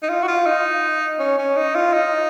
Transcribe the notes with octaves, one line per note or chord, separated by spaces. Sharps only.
D#4
F4
F#4
F4
D#4
C#4
C#4
D#4
F4
D#4